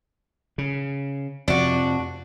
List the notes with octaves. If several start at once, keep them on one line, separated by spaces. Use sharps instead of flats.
C#3
F2 C3 F3 D4 F#4